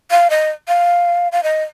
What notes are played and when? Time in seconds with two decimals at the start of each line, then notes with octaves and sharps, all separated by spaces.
0.11 F5
0.30 D#5
0.68 F5
1.32 F5
1.43 D#5